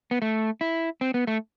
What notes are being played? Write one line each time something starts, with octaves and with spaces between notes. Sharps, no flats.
B3
A3
E4
C4
B3
A3